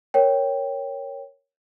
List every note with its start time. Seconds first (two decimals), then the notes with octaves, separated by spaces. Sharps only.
0.14 A#4 C#5 G5